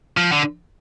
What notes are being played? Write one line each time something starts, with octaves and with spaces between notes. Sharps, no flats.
F3
D3